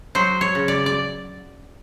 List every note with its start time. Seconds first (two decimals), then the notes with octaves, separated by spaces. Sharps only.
0.15 F#3 C5
0.41 C#5
0.55 C#3
0.68 D5
0.86 D5